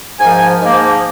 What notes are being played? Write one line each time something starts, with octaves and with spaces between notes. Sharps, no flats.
G#2 F3 A#3 G#5
G#2 F3 A#3